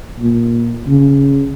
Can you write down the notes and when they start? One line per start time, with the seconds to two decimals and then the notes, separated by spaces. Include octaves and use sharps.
0.20 A#2
0.87 C#3